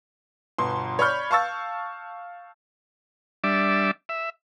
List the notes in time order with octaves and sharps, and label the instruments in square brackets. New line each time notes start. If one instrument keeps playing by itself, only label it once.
[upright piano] G1 B2 C6
C#5 D5 B5 C#6 F6 G6
F5 A5 C#6 E6 A6
[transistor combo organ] G3 D4 D5 E5
E5